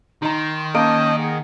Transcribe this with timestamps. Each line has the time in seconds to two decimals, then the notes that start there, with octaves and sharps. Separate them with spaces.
0.22 D#3 D#4 A#5 C6
0.74 A#3 C#4 D#5 F5 A5 G6 D7
1.17 D#4 G#4 F#5